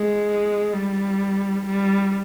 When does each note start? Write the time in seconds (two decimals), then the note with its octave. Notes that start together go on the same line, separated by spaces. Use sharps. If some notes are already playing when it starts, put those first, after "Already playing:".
Already playing: G#3
0.74 G3
1.67 G3